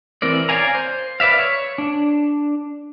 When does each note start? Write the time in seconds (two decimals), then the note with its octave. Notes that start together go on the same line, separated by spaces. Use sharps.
0.22 E3 C4 A#4 D5
0.49 C#5 D5 F5 G#5 A#5
0.75 C5
1.20 B4 D5 E5 F5
1.39 C#5
1.78 D4